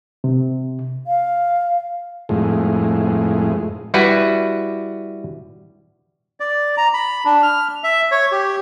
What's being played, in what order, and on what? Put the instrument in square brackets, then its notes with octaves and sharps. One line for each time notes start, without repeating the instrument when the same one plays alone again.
[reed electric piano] C3
[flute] F5
[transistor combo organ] F2 A2 G#3
[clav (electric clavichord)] G3 E4 F#4 B4
[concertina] D5
A#5
B5
D4
F6
E5
C#5
G4